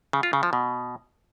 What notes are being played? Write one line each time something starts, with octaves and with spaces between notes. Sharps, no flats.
C#3
F4
C#3
F3
B2